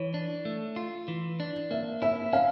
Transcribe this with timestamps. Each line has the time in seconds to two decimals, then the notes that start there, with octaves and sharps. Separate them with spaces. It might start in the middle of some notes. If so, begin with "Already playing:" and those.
Already playing: E3 C#5
0.14 D4
0.45 A3
0.76 F4
1.08 E3
1.40 D4
1.71 A#3 E5
2.02 E4 E5
2.33 C#4 F5